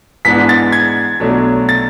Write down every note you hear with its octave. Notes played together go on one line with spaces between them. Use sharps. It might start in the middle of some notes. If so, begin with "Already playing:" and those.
G#2 E3 G#3 B3 D4 B6
A6
G#6
B1 B2 F#3 A3 D4
A6